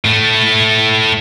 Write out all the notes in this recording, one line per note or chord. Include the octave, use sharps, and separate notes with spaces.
A2 A3